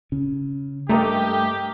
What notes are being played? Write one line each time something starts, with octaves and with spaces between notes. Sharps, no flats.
C#3 C#4
G2 A3 A#3 G4 D#5 A#5